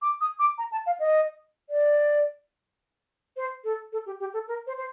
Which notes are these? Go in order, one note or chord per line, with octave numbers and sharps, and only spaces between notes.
D6
D#6
D6
A#5
A5
F5
D#5
D5
C5
A4
A4
G4
G4
A4
A#4
C5
C5